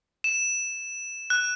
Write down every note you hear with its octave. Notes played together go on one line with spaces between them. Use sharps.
E7
F#6